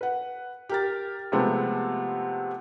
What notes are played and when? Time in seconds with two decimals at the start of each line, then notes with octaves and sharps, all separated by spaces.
0.01 B4 F#5
0.69 G4 A#4 A6
1.32 C3 F3 G#3 A3 B3 C4